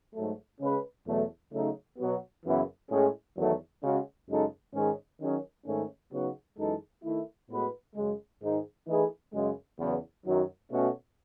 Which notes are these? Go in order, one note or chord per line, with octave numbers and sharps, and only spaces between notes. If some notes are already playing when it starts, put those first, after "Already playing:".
G#2 F#3 A3
C#3 G#3 C#4 G#4 B4
E2 B2 F#3 A3
C#3 F#3 A3 D#4
B2 F#3 B3 F#4
F#2 C#3 E3 B3 E4
A2 G#3 C#4 G#4
E2 D#3 F#3 A3
C#3 G#3 C#4 F#4
F#2 C#3 G#3 D#4 A4
G#2 D#3 G#3 C#4 G#4
D#3 F#3 C#4 G#4
G#2 D#3 A3 C#4
C#3 F#3 B3 D#4 F#4
F#2 E3 G#3 D#4 A4
D#3 A3 E4
A2 G#3 B3 F#4 B4
F#2 C#3 G#3
G#2 D#3 G#3 D#4 G#4
E3 A3 D#4 G#4 B4
F#2 C#3 G#3
E2 C#3 F#3 B3
F#2 D#3 F#3
B2 A3 C#4 F#4